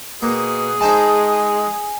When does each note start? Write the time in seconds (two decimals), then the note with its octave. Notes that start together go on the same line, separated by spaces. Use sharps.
0.22 B2 A#3 G#4
0.81 G#3 D#4 C5 G#5 A5